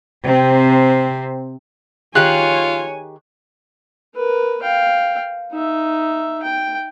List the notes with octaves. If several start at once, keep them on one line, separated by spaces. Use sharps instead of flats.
C3 C4
D#3 F4 G4 G#4 C#5 G#5 F#6
A#4 B4
F5 G5
D#4 E5
G5